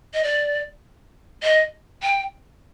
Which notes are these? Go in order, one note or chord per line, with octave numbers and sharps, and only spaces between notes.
D#5
D5
D#5
G5